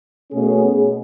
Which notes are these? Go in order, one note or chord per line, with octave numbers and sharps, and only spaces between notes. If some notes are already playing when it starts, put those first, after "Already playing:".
B2 A3 C#4 G#4